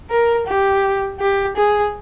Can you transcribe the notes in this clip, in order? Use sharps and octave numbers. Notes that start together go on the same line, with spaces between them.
A#4
G4
G4
G#4